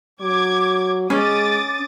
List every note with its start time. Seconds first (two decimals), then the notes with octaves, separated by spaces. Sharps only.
0.21 F#3 D6 G#6
1.10 G#3 C#4 D6 D#6 A6